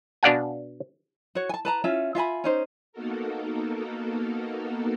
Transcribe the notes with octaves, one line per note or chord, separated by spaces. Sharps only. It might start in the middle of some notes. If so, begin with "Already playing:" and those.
B2 D4 D5 F5 F#5 G#5
F#4 C#5
G#5 A5
B4 A5 A#5
C#4 F4 E5
F4 E5 G#5 B5
C#4 D#4 C5
A#3 B3 D#4 F#4 A4 A#4